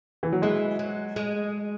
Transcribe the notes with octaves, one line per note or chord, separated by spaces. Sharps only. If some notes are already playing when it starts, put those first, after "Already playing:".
E3
F#3
E3 G#3
F#3
G#3